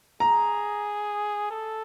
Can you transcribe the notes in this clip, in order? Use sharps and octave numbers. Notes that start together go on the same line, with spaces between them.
G#4 A#5
A4